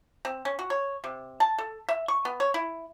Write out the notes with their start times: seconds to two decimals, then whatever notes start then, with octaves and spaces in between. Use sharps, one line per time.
0.25 C4
0.45 C#4
0.59 F#4
0.70 C#5
1.04 C3
1.40 A5
1.58 A4
1.89 E5
2.08 C#6
2.25 B3
2.40 C#5
2.54 E4